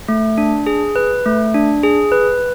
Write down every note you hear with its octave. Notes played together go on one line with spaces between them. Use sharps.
A3
D4
G#4
B4
A3
D4
G#4
B4